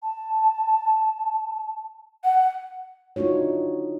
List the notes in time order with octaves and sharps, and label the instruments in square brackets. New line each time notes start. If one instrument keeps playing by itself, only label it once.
[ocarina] A5
[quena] F#5
[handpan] D4 D#4 F4 F#4 C#5